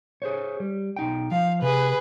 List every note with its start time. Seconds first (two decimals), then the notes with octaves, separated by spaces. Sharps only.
0.22 G#4 C5 C#5
0.60 G3
0.96 B1 D#4 G5
1.31 F3 F5
1.62 C3 G#4 B4